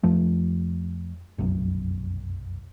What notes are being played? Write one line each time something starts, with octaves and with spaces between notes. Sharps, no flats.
F2 F3 A3
F1 B1 F#2